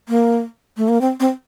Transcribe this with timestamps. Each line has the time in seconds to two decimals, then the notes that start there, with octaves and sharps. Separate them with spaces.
0.09 A#3
0.77 A3
0.88 A#3
1.01 C4
1.20 C4